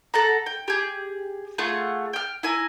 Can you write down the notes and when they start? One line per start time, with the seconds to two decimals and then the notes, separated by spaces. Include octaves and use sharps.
0.14 A4 F#5 A#5
0.46 G5
0.68 G4 G#4
1.58 A3 F4 G#4 F#5
2.13 G5 F6
2.43 E4 G#5 A#5